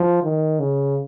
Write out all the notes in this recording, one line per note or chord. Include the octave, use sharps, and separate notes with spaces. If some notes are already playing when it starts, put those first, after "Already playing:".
Already playing: F3
D#3
C#3